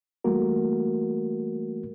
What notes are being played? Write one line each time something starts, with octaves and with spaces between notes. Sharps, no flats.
E3 G3 A3 A#3 F#4 A#4